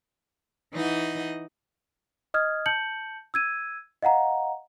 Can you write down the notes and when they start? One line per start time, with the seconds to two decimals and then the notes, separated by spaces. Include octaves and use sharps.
0.73 E3 D#4 D#5 F#5
2.34 D#5 D#6 F6 G#6
2.66 A5 G6 C#7 F#7
3.34 E6 G#6 D#7
4.03 D#5 F5 F#5 A#5